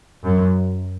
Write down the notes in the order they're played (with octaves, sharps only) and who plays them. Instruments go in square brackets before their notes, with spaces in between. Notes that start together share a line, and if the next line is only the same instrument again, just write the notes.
[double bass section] F#2